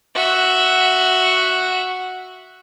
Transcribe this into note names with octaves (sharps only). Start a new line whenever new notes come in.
F#4 E5